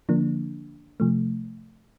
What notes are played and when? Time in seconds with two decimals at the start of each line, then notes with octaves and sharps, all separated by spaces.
0.09 D3 F3 A#3 D4
1.00 C3 F3 A3